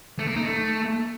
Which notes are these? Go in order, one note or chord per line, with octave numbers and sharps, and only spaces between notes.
A3
A#3
D#4
A3